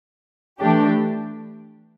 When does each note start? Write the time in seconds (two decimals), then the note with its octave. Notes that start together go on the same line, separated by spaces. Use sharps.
0.60 E3 A3 D4 G4